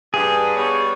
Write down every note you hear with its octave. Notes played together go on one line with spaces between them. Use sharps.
G2 G#4
G3 B3 C#5